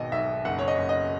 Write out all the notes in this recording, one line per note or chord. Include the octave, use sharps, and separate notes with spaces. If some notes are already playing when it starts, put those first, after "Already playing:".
Already playing: G#1 B2 D#5
B1 E5
F#1 F#5
C#5
D#5
F#1
D#5